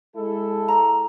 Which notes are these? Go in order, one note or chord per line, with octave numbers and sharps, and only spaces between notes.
G#3 E4 A4
A#5